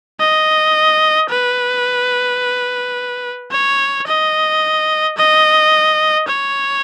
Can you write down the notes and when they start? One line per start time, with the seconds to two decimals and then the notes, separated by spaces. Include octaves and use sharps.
0.20 D#5
1.30 B4
3.52 C#5
4.07 D#5
5.18 D#5
6.28 C#5